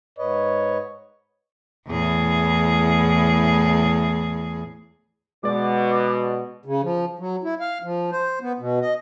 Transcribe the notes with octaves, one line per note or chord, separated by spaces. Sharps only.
G#2 B4 C#5 D#5
E2 A2 G#4
B2 G#3 D5 D6
C#3
F3
F#3
E4
F5
F3
C5
B3
B2
D#5